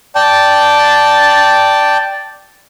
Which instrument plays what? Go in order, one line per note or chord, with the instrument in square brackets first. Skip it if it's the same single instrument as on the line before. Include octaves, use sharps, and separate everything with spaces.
[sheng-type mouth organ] D5 G5 A5